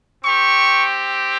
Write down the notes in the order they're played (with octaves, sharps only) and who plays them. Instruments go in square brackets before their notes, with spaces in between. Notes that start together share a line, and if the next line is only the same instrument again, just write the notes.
[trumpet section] C4 G4 C#6